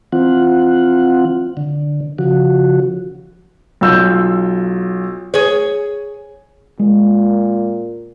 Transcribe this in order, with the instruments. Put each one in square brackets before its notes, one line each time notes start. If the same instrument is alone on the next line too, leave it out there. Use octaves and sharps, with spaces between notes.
[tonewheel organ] E3 C4 F4 F#5
D3
C#3 F3 F#4
[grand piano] B1 F4 E6 G6
[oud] G#4 C#5
[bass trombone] A#2 [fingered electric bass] G#3